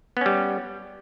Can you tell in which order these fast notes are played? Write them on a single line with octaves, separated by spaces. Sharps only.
B3 C#4 G3